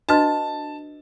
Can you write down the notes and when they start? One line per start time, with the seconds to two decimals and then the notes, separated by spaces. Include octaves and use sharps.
0.09 D4 F#4 B4 D#5 A5